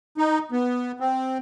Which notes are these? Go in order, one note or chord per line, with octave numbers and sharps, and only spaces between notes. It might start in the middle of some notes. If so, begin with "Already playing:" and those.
D#4
B3
C4